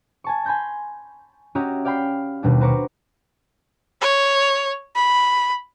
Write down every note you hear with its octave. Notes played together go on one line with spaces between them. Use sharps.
G#5 A5 C#6
G#5 B5 C6 G6 A#6
C#4 F#4 G4 D#5 E5 A#5
D5 F5 G5 B5 D6 C7
D#2 B2 G3 D4
F#4 B4 C5 A#5 C#6 D6
C#5
B5